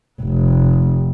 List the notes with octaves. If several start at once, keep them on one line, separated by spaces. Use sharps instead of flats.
F1